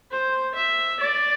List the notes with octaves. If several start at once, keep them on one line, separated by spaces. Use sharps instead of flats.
C5
E5
D5